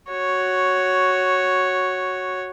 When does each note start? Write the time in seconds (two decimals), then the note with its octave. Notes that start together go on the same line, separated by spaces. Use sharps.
0.11 F#4 C#5